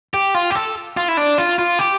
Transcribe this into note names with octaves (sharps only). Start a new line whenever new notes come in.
G4
F4
G4
A4
F4
E4
D4
F4
F4
G4